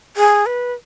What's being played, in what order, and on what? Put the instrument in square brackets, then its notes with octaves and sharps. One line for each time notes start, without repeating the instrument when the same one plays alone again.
[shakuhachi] G#4
B4